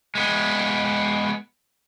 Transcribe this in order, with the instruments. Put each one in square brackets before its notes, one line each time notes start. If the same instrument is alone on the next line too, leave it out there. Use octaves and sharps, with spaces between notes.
[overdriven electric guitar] G#3 B3